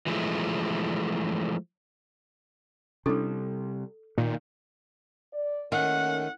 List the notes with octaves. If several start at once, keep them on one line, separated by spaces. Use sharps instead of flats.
E3 F3 G#3 A3
C3 G3 C#4 D4 E4 A4
A#2 D#3
D5
D#3 A3 A#3 C#4 F#5